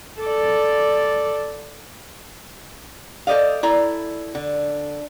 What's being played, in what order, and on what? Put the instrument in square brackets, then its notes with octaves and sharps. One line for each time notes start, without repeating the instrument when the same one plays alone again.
[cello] A4 D5
[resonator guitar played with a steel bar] A4 C5 D5 D#5 F5
E4 A4 D5 A#5
D3